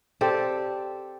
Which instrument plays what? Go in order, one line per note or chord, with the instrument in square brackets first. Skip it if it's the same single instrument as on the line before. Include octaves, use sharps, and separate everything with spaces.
[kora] C4 G4 A4 D5